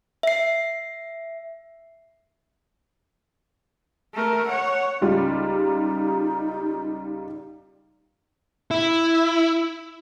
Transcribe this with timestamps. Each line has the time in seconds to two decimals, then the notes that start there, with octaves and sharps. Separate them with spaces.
0.23 E5 C7
4.14 A3 A#4
4.47 C#5 F#5
5.02 C#2 G3 D#4 F4
8.71 E4